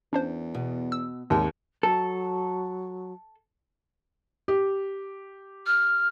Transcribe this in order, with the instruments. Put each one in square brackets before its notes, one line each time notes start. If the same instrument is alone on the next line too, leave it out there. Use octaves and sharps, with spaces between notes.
[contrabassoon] E2 [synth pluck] C#4 D4 C5
[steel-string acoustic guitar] B2
[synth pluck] E6
[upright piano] D#2 [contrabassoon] C3 [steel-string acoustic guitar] G#3 C#5
[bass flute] F#3 [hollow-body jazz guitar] A4
[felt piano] G4
[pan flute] F6